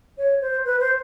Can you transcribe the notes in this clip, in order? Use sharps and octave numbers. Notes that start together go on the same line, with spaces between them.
C#5
C5
B4
C5